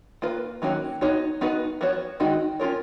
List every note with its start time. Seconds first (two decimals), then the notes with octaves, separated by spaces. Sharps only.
0.22 A#3 F4 B4
0.62 D#3 F#3 A#3 C#4 F#4
1.01 B3 D#4 F#4 C#5
1.41 B3 D#4 F#4 B4
1.81 F3 B3 F#4 C#5
2.20 D#3 G#3 D#4 F#4
2.60 C#4 F4 A#4 C#5